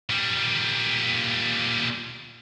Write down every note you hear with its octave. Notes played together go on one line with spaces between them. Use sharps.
A#2 G3